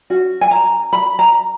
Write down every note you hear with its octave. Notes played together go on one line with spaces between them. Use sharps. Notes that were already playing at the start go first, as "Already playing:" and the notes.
C#4 F#4
G#5
A#5
B5
A#5